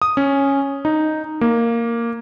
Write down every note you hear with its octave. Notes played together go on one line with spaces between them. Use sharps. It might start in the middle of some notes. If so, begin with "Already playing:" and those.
D#6
C#4
D#4
A#3